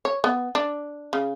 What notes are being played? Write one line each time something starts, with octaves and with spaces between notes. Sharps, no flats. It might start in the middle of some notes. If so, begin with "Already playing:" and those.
C#5
B3
D4
C#3